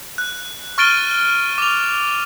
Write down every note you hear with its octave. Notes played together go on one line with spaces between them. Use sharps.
F#6
C#6 F6 A6 D7 D#7 G7
D6 F7